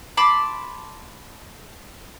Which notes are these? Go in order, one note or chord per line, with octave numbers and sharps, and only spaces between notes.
A5 B5 C6 D6